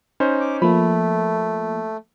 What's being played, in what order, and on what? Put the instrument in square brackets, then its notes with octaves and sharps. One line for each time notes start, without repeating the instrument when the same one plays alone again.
[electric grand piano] C#4 D#4 C5
[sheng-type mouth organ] D6
[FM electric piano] F3 A#3 [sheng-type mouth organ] A3 [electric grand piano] B5